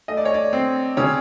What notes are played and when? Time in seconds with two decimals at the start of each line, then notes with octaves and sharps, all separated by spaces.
0.08 A3 D#5
0.17 D5
0.25 C#5
0.34 D5
0.53 C4
0.97 C#3 C#5